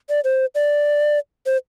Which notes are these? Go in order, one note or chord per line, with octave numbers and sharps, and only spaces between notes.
D5
C5
D5
C5